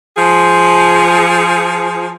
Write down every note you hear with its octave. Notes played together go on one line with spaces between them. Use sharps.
F3 G#4